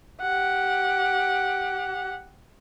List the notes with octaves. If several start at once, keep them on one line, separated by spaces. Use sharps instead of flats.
G4 F#5